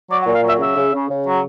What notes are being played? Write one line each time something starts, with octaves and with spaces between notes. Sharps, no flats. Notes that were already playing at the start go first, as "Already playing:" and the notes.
F#3 D5
F#5
A#2
F5
F#3 E5
C#3 E5
C#3
C#3
C#3
F#3